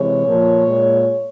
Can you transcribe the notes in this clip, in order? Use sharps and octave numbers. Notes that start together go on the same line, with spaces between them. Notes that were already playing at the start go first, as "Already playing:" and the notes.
Already playing: C3 E3 G#3 C#5
A#2 F3 A#3
A#2 G#3